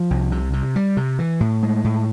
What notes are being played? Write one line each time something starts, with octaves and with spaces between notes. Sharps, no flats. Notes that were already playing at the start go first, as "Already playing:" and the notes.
Already playing: F3
C2
C3
C3
G3
C3
E3
A2
G#3
A2